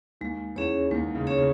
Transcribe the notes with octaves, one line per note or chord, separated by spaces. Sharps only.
D#2 D#3 G#3
E2 E3 C#4 G#4 C#5
D#2 D#3 G#3
C#2 C#3
C#4 G#4 C#5
C#3